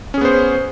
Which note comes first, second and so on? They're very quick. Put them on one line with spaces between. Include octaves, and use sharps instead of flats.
C#4 G#4 B3 C5